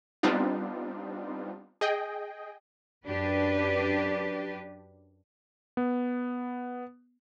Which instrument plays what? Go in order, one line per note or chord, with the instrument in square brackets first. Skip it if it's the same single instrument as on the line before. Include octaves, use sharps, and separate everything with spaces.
[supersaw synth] G3 B3 C4 D4 D#4 F4
G#4 D#5 G5
[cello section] F#2 D4 G4 B4 D5
[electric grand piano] B3